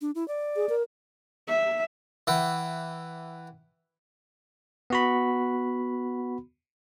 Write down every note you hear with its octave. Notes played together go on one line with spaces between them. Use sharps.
D4
E4
D5
G#4
A#4
E5
E3 E5 F#5 G5 B5
B3 F#4 B5